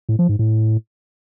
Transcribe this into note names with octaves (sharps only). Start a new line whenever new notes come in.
A2
F3
G#2
A2